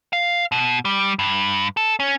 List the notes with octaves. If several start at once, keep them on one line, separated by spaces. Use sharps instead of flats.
F5
B2
G3
G2
A4
C#4